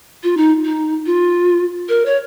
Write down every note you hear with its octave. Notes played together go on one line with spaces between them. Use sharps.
F4
D#4
D#4
F4
A#4
C#5